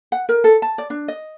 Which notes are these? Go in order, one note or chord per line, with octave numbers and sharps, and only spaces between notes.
F#5
A#4
A4
A5
D5
D4
D#5